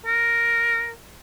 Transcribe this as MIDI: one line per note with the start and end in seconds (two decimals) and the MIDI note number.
0.06 0.91 70